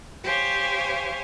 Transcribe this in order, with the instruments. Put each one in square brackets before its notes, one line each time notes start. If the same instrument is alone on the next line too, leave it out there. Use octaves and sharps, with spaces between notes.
[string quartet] G4 C5 C#5 F5 G#5